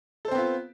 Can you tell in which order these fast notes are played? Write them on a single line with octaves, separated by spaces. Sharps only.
A4 C5 C4 B3 F4